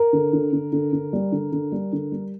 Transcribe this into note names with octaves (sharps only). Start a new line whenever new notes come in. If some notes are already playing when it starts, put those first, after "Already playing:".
Already playing: A#4
D3
D3
D3
D3
D3
G3
D3
D3
G3
D3
G3